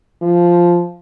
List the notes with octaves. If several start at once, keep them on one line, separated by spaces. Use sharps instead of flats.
F3